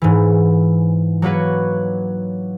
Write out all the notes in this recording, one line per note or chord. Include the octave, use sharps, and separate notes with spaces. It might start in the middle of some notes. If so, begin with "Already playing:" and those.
G#2 E3
F#3 A#3 F#4 B4 C#5